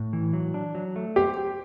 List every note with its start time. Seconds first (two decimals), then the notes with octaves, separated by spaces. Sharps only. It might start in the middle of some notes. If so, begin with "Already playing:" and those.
Already playing: A2
0.13 E3
0.33 F#3
0.54 D4
0.75 F#3
0.96 A3
1.16 G4 C5
1.37 G4